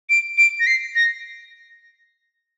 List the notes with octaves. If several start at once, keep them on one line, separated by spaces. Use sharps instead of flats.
D7
D7
A#6
C7
A#6